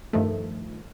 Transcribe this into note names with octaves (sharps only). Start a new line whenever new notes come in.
G2 D#3 F3 A3